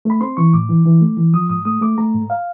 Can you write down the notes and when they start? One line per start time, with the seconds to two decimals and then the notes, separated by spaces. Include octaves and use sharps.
0.05 A3 B5
0.21 C4 C6
0.37 E3 C#6
0.53 A2 D6
0.69 E3
0.85 E3
1.01 A3
1.17 E3
1.33 F3 D#6
1.49 G#2 D#6
1.65 A3 D#6
1.81 A3 D6
1.98 A3 A#5
2.14 G#2
2.30 F5